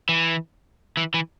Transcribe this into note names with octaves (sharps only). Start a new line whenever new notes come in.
E3
E3
E3